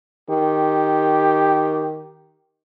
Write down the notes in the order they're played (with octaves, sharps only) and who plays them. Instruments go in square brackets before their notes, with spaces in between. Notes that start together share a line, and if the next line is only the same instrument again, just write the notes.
[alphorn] D#3 [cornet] G4